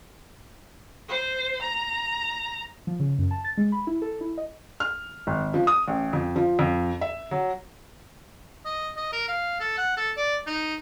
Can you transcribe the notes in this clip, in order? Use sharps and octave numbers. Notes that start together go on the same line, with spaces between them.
C5
A#5
F3
C#3
F#2
A5
A6
G#3
B5
E4
A4
E4
D#5
F6
G#1
F3
D#6
A1
F2
F3
F2
E5
F#3
D#5
D#5
A#4
F5
A4
F#5
A4
D5
D#4